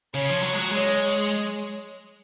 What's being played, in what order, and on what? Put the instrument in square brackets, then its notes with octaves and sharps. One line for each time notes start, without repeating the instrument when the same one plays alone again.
[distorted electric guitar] C#3 [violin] C#5
[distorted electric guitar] F3
F#3
G#3
F#3
[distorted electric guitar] G#3 [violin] C#5